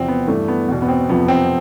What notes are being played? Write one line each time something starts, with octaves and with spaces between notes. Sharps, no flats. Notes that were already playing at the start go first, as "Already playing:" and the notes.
Already playing: E2 C3 F3 C4
B3
G2 E3 A3
B3
E2 B2
B3
C4
F2 C3 F3 B3
C4